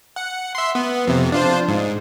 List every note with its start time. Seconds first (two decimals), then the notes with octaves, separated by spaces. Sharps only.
0.16 F#5
0.55 E5 C6
0.75 B3
1.07 F2 C3
1.32 D4 F4 C5
1.68 G#2